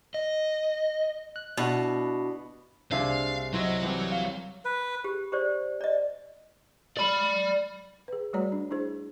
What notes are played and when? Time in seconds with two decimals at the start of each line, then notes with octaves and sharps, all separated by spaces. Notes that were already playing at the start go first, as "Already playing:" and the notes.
0.14 D#5
1.36 F#6
1.57 B2 D4 E4 F#4
2.92 C2 D4 G#4 E5 F5
3.54 F#3 E4 C5 D#5
3.82 C2 E3 C4
4.11 F5
4.65 B4
5.04 G4
5.32 G4 C5 D5
5.81 D5 D#5
6.97 D5 B5
8.08 G#4 B4
8.33 G3 A3 F#4 C#5 D5 A#5
8.52 D4
8.71 D4 E4 G#4 C5